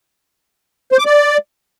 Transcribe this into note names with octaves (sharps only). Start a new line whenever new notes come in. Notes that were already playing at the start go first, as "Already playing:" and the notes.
C5
D6
D5